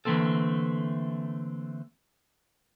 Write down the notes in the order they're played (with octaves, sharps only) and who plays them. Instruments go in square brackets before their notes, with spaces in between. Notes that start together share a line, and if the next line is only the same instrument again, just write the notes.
[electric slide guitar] D3 E3 A3 A#3 C4 A4